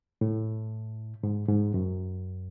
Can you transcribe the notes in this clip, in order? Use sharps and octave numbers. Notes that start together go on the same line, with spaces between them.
A2
G#2
G#2
F#2